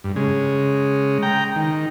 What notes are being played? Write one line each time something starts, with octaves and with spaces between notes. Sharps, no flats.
G2
C#3 G#3
G5 A#5
D#3